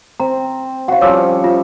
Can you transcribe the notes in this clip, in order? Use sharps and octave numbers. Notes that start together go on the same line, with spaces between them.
C4 A#5
F#4 C#5 F5 F#5
F3 G3 C#4 C#5 D6 E6
F4 E5